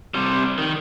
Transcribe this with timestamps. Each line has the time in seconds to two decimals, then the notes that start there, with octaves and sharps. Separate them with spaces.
0.14 C3 G3
0.58 D#3